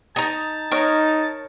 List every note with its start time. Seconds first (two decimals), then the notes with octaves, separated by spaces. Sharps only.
0.16 D#4 A5 A#5
0.71 D#4 A#4 C#5